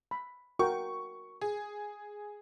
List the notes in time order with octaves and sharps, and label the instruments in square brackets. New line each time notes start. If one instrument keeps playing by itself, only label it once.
[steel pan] B5
[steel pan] F#4 A#4 G5 [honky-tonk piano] C#6
[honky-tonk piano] G#4